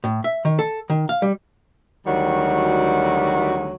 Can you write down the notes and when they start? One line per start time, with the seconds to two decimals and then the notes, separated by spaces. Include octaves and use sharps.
0.04 A2
0.24 E5
0.45 D#3
0.59 A4
0.90 D#3
1.09 F5
1.22 G3
2.06 D2 D#3 F#3 G3 F#4